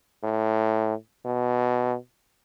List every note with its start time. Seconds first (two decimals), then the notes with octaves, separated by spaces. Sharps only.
0.23 A2
1.25 B2